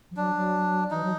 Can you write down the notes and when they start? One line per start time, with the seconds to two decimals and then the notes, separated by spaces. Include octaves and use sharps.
0.11 F3
0.16 F#3 D4
0.35 F#3
0.91 E3 D#4
1.03 F#3